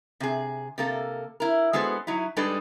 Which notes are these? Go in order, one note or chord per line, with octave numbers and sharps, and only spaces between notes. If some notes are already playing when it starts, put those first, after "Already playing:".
C3 G#4
C3 A#3 A4
E4 A#4
G#3 B3 F#4 A4 C5
F#3 D#4 E4
G3 G#3 D4 D#4 A4 B4